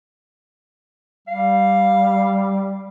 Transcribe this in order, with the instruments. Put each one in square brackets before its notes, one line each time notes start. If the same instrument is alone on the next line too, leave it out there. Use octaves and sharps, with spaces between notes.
[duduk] G3 [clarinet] F5